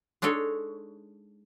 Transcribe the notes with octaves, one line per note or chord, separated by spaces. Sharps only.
G#3 D4 D#4 A4 C#5